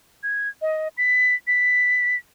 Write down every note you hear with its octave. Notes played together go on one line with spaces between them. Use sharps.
G#6
D#5
B6
B6